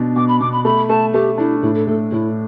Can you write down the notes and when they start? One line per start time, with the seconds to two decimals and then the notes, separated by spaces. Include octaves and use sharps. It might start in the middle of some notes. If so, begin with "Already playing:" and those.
Already playing: B2 D4
0.16 B2 D6
0.28 B5
0.40 B2 D6
0.52 B5
0.65 A3 B5
0.89 A3 A5
1.13 A3 G4
1.38 D4 E4
1.63 A2 E4
1.75 A4
1.87 A2 A4
2.11 A2 E4